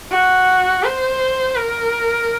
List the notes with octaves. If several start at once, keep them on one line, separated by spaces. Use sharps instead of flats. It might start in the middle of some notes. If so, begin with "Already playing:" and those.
F#4
C5
A#4